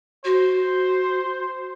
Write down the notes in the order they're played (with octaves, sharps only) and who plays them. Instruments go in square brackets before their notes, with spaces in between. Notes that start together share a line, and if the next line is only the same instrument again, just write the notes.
[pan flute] F#4 [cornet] C5